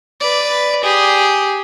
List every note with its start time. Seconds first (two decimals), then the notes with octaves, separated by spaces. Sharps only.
0.21 B4 D5
0.83 G4 G#4